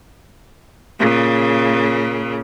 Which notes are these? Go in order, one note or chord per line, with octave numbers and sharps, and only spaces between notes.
A#2 C#3